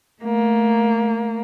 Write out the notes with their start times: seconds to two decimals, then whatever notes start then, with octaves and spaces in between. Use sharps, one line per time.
0.23 A3 A#3